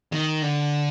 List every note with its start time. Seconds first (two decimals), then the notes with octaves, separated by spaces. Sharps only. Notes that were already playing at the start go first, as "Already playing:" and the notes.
0.12 D#3
0.42 D3